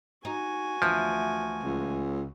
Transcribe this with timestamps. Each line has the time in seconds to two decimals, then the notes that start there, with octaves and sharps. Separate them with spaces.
0.25 D#4 F#4 G#5
0.82 D2 E3 F3 B3
1.63 C#2